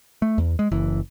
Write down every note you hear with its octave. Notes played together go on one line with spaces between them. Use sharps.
A3
E2
G#3
F#1 E3